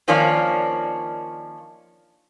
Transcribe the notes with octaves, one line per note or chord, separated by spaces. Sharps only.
D#3 F3 A#3 C#4 D4 D5